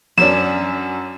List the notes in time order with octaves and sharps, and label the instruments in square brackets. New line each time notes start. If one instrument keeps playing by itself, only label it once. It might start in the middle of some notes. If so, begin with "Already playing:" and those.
[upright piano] F#2 C#4 D4 [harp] E7